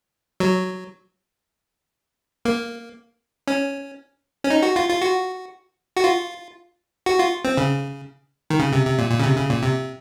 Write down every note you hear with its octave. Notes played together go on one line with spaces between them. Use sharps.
F#3
A#3
C#4
C#4
D#4
F#4
F4
F4
F#4
F#4
F4
F#4
F4
C4
C#3
D#3
C#3
C3
C3
A#2
A#2
C#3
C3
C#3
A#2
C3